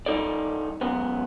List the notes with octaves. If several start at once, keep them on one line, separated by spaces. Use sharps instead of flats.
G3 D#4 A4 D5
C#2 F#2 C#3 B3